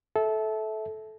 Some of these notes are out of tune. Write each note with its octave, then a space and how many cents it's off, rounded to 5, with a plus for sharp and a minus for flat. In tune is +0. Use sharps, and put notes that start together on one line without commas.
A4 -20 E5 -15